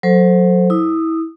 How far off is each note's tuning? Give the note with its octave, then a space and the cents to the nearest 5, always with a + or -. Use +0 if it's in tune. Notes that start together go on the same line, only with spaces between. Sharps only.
F#3 -20 A4 +10 C5 +0
E4 -25 D#6 -20